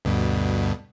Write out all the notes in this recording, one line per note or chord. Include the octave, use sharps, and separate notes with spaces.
D2 G2 B2